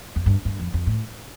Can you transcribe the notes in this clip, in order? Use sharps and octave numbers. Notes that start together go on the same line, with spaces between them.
F2
G2
G2
F2
F2
A2